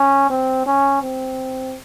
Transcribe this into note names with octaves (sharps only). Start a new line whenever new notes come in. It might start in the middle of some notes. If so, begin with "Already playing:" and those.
Already playing: C#4
C4
C#4
C4